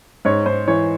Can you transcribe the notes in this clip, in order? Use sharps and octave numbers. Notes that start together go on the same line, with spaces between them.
G#2 C#5
G#2 C5
E3 C#5